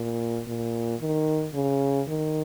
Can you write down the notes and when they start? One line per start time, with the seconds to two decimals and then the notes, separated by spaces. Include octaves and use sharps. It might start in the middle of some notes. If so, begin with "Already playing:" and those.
Already playing: A#2
0.47 A#2
1.01 D#3
1.54 C#3
2.08 D#3